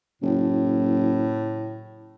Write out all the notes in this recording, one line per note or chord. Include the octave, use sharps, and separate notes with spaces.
F#1 A2